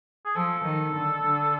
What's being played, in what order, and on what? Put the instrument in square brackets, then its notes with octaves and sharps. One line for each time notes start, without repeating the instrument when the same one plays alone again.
[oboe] G#4
[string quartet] F3 [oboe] A4
[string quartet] D#3
D3
D3